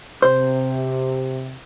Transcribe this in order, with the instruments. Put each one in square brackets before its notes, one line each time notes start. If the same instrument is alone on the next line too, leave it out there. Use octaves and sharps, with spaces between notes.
[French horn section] C3 [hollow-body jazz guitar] C5